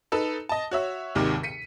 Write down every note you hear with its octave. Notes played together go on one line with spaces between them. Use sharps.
D#4 A4 B4
D#5 A5
F#4 C#5 E5
G#1 D#2 C3 D#3 D6
B6 C#7 D#7